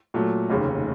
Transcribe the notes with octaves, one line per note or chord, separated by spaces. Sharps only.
A#2 F#3 A3
F1 D#2 C#3